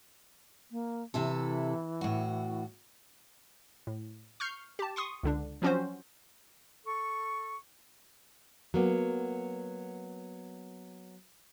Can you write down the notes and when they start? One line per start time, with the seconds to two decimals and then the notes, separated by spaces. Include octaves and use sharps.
0.71 A#3
1.14 C3 E3 E4 A4
2.01 A2 F#4
3.87 A2
4.40 C#6 F6 G6 C7
4.79 G4 A5
4.96 C6 C#6 D#6
5.23 C#2 D3 D4
5.62 F3 F#3 C4 C#4 F#4 C5
6.85 A4 C#6
8.74 F#3 A#3 B3